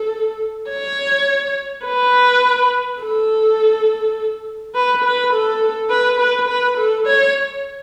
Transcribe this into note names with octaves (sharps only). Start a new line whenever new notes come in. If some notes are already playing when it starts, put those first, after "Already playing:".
Already playing: A4
C#5
B4
A4
B4
B4
A4
B4
B4
B4
A4
C#5